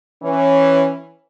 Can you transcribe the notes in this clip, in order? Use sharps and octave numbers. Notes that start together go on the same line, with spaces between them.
E3 C#4